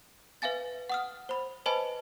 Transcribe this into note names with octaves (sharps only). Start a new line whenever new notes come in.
B4 E5 F5 G#5 A6
F#5 D#6 F6
C5 B5
B4 C5 D#5 G#5 A5 B5